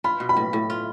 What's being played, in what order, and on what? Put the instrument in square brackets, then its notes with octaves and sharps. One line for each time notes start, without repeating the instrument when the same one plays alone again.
[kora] F4 [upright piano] B5
[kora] B2
[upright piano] B5
[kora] A2
A2
F4